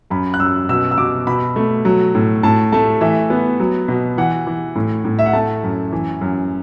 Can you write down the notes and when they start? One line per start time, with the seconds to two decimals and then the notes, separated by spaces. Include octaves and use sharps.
0.10 F#2 B5
0.34 F#6
0.40 F#2 E6
0.69 B2 E6
0.91 E6
0.98 B2 D6
1.27 B2 B5
1.56 A3
1.85 F#3
2.15 A2
2.43 A2 A5
2.72 A3 A5
3.01 E3 E5
3.30 B3
3.60 F#3
3.88 B2
4.18 E3 F#5
4.47 E3
4.76 A2
5.05 A2
5.19 E5
5.26 F#5
5.33 A3 A5
5.63 F#2
5.92 E3
6.21 F#2